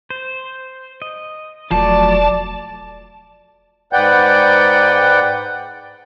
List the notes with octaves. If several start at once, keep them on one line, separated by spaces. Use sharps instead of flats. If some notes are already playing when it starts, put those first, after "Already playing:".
C5
D#5
E1 F3 F#3 A3 D5 A5
G#2 B4 D5 F#5 G5 G6